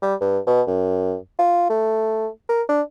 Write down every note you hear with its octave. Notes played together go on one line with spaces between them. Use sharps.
G3
G2
B2
F#2
F4
A3
A#4
D4